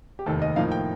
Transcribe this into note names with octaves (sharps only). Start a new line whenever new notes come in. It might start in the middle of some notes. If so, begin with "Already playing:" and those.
G4
F1 D#2 D#3 A4
D#5
A2 F3 A#3 D#4 F5
G5